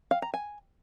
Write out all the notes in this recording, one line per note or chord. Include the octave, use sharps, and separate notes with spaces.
F5
A#5
G#5